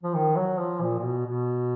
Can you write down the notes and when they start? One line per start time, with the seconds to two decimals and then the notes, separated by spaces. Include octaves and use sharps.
0.03 F3
0.14 D#3
0.36 F#3
0.59 F3
0.82 A#2
0.99 A#2
1.04 B2
1.26 B2